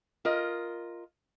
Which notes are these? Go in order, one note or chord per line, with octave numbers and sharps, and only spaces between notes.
F4 A#4 D#5